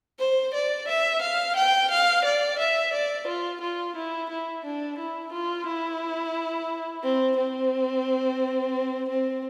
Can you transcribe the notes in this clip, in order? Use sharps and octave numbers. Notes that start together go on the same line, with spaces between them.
C5
D5
E5
F5
G5
F5
D5
E5
D5
F4
F4
E4
E4
D4
E4
F4
E4
C4
C4
C4